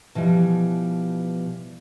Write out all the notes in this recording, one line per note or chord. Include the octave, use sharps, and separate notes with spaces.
B2 E3 F3 G3